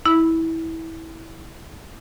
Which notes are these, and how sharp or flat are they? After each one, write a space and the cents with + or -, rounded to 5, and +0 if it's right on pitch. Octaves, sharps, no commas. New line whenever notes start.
E4 -20 B5 +0